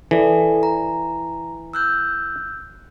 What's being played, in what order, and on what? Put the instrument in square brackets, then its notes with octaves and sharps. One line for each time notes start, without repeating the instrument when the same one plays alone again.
[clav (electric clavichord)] E3 [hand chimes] A4 D5
[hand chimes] A#5
E6 F#6 G6